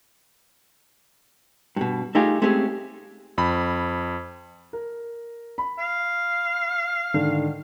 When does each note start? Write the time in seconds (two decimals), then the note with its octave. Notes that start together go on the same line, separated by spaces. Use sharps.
1.76 G2 B2
2.15 A3 D#4 F4 G4 G#4
2.42 G#3 A3 C4 C#4 G4 G#4
3.38 F2 B5
4.73 A#4
5.58 B5
5.79 F5
7.14 G#2 D3 D#3